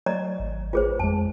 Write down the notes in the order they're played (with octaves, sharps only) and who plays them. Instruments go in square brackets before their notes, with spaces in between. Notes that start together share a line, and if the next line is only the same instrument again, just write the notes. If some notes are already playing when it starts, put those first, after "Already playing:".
[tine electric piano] F#3 [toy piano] D5 D#5 A#5
[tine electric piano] G#1
[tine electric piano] A1 B4 [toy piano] F4 G#4 C5
[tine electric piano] F2 G#3 [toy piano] A5